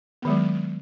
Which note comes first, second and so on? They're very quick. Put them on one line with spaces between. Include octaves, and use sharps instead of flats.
B3 D#3 G#3 F#3